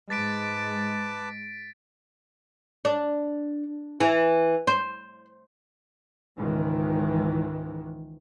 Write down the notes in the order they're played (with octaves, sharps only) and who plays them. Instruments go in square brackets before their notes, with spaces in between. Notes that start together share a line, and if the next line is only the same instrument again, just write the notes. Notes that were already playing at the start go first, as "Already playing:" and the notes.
[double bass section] G#2 G#3 [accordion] B4 A5 D6 [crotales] A6 B6 D7
[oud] D4
E3
C5
[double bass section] C#2 G#2 D#3 E3